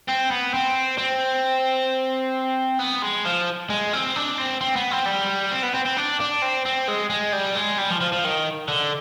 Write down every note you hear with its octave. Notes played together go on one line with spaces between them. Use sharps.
C4
B3
C4
C4
B3
G#3
F3
G#3
C4
D4
C4
C4
B3
C4
G3
C4
B3
C4
C4
D4
D4
C4
C4
G#3
G#3
G3
G#3
G3
F3
F3
F3
D#3
D3